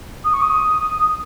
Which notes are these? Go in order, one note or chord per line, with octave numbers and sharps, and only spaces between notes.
D#6
C#6
D#6